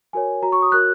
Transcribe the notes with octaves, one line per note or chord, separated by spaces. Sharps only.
F#4 A#4 C#5 G#5
F#4 C#5 A#5
C#6
D#6
F#4 A#4 C#5 F#6